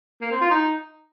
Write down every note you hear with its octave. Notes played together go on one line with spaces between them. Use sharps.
A#3
C4
F4
D#4